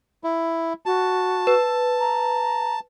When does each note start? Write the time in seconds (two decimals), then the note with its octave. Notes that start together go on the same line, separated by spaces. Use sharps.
0.24 E4
0.86 F#4 A5
1.47 B4
2.00 A#5